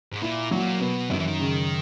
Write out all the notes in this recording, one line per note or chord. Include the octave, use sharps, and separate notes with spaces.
G#2
A#2 E4
A#2 F#3
B2 B3
F#2 D#3
E3
D#3
C#3